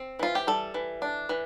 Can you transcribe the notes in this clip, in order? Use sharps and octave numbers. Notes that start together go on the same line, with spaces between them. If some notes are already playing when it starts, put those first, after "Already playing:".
Already playing: C4
E3 F4
G4
G3 A4
E3
D4
E3